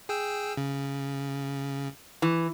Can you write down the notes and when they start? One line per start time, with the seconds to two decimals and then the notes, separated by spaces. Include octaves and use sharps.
0.09 G#4 G5 E6
0.57 C#3
2.22 E3